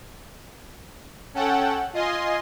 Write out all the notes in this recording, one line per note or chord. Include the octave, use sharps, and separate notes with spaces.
C#4 A4 F#5 G5
F4 D#5 G#5 C6